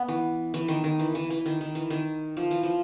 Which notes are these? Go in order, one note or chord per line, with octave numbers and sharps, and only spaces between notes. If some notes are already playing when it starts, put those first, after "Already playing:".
Already playing: B3
E3
E3
D#3
D#3
E3
E3
E3
D#3
D#3
E3
D#3
F3
E3
F3